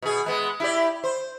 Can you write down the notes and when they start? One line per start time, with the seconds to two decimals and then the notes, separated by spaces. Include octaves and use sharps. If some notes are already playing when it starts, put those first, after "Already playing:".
0.02 B2 G#4
0.26 G#3 B3
0.60 E4 G4 D5
1.04 C5